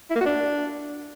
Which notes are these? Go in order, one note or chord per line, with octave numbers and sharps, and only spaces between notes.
E4
A#3
F#4
D4